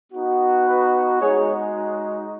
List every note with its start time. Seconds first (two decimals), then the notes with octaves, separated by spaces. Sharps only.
0.12 B3 D#4 F#4
0.67 B4
1.21 G#3 D#4 F#4 G#4 C#5